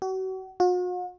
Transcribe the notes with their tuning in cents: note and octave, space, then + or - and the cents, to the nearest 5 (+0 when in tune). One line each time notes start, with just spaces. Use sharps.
F#4 +35
F#4 -45